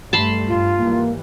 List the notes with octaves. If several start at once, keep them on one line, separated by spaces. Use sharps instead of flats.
G2 G3 A3 A5 B5 C6
G2 F4
G#2 E3 G3 A#3